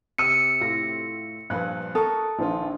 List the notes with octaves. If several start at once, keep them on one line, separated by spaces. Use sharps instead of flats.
C3 G4 E6 C#7 D#7 E7
A2 F4 A#6
G2 A#2 F3 B4 F#6
A4 A#4 C#6 D#6
A#1 D#3 F4 C5